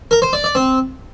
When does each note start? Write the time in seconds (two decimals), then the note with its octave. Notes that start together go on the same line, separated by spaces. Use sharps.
0.11 A#4
0.22 C5
0.33 D5
0.44 D5
0.55 C4